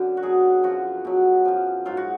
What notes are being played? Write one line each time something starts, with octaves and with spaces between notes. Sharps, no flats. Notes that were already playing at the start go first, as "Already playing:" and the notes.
Already playing: F#2 D3
F#4
B2 F#3 G#4
F#2 F3 F#4
B2 F#3
F#2 F3
G#2 F#3 F4
F#4